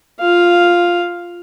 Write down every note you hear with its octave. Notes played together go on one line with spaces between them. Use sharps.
F4 F5